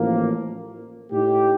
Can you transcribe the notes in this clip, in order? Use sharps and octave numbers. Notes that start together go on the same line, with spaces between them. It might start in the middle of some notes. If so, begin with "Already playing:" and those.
Already playing: A1 A2 F3 A#3
A2 A3 D#4 G4